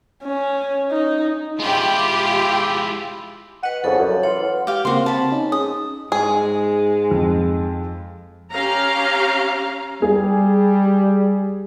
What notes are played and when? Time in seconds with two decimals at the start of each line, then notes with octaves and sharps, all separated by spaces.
0.24 C#4
0.91 D#4
1.60 G#3 E4 F4 G4
3.63 B4 D#5 F#5
3.84 C2 F2 C#3 A4
3.99 F#2
4.23 E3 F4 C#5 F#5
4.67 G4 F5
4.85 C#3 A#3 C4 F#4 C6
5.06 C4 A5 B5
5.32 C#4 D#4
5.52 G#4 D#6
6.12 G#2 G#3 G#4
7.11 F2
8.51 C#4 G4 F5 A#5
10.02 G3 G#4